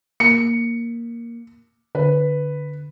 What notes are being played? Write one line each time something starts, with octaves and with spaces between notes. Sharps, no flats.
A#3 C#7
D3 B4